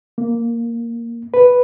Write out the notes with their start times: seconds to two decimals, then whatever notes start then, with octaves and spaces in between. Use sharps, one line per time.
0.18 A#3
1.34 B4